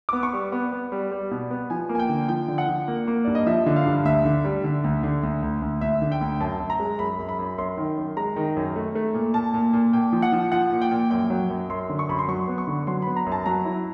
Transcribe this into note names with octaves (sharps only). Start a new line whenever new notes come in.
B3 D6
C#6
G3
B3
B3
G3
G3
B2
B3
F3 G#5
A#3
G#5
G5
D3
F3 G5
D3
F#5
F3
A#3
A#3
G2 D5
D#5
F3 E5
D3
F5
G2
D2 E5
D3
G3
D3
D2
D3
D2
D2
D2
D2 E5
D3
G5
D2
F#2 A5
F#2
A#5
G#3
F#2 B5
F#2
B5
F#2
F#2 C6
D#3
F#2
G#3 A#5
D#3
F#2
A3
A3
A#2
A#2 A5
A#2
A#2
A#2 G5
F3
F#5
F3
F3 F#5
A#2
G5
A#2
F#2 G5
F#3
F#2
F#2 C6
D3
C#6
F#2 B5
C6
F#3 C#6
B3
C#6
D3
F#3 C6
B3 B5
A#5
F#2
A5
F#3 A#5
E4